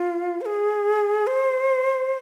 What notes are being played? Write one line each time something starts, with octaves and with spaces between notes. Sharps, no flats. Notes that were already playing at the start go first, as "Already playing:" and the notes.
Already playing: F4
C5
G#4
C5